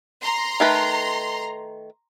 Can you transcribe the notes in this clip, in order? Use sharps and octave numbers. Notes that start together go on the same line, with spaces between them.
A#5 C6
D#3 A3 B4